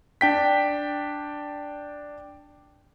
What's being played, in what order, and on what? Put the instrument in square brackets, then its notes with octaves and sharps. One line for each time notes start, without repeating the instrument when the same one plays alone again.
[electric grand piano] D4 G5 B6